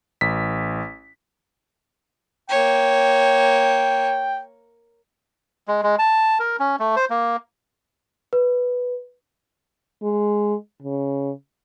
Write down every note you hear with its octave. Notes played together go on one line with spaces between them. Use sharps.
A1 B6
A#3 C#5 G5
G#3
G#3
A5
A#4
C#4
A3
C5
A#3
B4
G#3
C#3